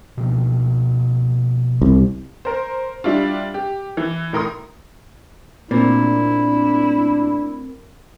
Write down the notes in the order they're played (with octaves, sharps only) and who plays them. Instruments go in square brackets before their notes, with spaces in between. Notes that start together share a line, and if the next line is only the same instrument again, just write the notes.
[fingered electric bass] B2 F3 A#3
[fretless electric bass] C2
[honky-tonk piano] A#4 C5
G3 D4 E4 F4
G4
E3
A2 A#4 C6 D#6
[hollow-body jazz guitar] A#2 [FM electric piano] A3 C4 A#4 [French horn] D4 [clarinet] E4